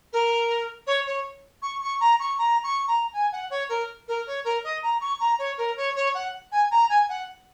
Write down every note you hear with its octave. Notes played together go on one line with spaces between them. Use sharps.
A#4
C#5
C#5
C#6
C#6
A#5
C#6
A#5
C#6
A#5
G#5
F#5
C#5
A#4
A#4
C#5
A#4
D#5
A#5
C#6
A#5
C#5
A#4
C#5
C#5
F#5
G#5
A#5
G#5
F#5